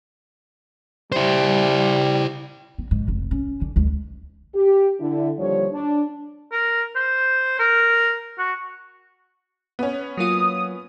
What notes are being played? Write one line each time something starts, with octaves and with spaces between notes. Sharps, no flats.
G3 E4 C5
B3
G#2
F1
C#4
D3
D2 G#3
G4
D3 E4
D#2 D3 F3 G3 C#5
D4
A#4
C5
A#4
F#4
B3 C#4
F#3 A#3 F4 D#6